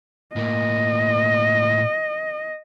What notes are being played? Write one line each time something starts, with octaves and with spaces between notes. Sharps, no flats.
A2 A#3 D#5